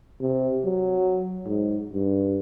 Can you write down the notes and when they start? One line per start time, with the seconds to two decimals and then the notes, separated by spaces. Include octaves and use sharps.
0.21 C3
0.64 F#3
1.45 G#2
1.93 G2